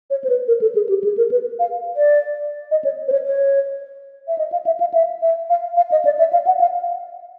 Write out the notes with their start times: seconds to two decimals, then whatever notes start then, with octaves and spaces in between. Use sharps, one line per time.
0.10 C#5
0.24 C5
0.29 B4
0.48 A#4
0.61 A4
0.75 G#4
0.89 G4
1.04 G#4
1.17 A#4
1.31 B4
1.59 F5
1.96 D5
2.71 D#5
2.84 C#5
3.08 C5
3.12 C#5
3.26 C#5
4.28 E5
4.38 D#5
4.52 F5
4.66 E5
4.80 F5
4.94 E5
5.22 E5
5.50 F5
5.77 F5
5.92 D#5
6.05 D5
6.19 E5
6.33 F5
6.47 F#5
6.60 F5